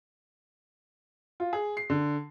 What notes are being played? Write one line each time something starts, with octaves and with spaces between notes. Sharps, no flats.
F4
G#4
C7
D3